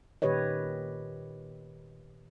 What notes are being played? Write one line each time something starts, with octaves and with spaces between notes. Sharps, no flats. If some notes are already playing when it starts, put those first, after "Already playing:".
A#2 D#3 G4 B4 C#5 D#5